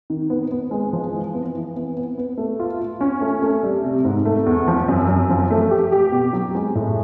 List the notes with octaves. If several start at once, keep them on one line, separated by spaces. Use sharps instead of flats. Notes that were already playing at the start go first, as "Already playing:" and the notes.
D#3
B3
B3
G#3
F3
E3
B3
E3
B3
B3
B3
A3
F4
F4
C#4
A3
A3
G3
C3
G#2
A3
E2
F3
F#2
F#2
F3
A3
G4
G4
B2
F#3
G#3
A2